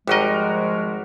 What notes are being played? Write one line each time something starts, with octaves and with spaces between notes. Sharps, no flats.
G#1 F3 G3 G#3 F#4 A#4 D#5